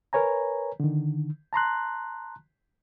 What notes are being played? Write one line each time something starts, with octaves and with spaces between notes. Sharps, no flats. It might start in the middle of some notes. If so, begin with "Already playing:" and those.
A#4 B4 C#5 G#5 A#5
D3 D#3
A5 A#5 C6 F#6